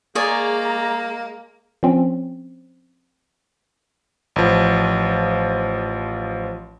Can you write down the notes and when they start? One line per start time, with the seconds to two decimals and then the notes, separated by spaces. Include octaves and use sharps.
0.15 G#3 A#3 G#4 C#5 D5 A#5
1.83 F3 C4 C#4
4.36 A1 F3